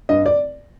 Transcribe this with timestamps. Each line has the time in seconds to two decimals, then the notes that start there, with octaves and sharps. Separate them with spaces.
0.09 G2 D#5
0.26 D5